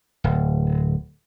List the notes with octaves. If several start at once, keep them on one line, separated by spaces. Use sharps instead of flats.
D1